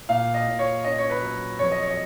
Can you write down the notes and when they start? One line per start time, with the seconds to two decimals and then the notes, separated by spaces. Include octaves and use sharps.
0.09 A#2 F5
0.34 D#5
0.47 A#2
0.59 C#5
0.84 C#4 D#5
0.98 C#5
1.10 B4
1.22 F#3
1.59 F2 C#5
1.72 D#5
1.83 C#5
1.90 D#5